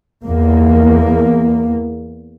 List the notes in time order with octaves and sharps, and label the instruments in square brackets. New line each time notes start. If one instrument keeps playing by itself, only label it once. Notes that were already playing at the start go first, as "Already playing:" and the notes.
[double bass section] E2 A#3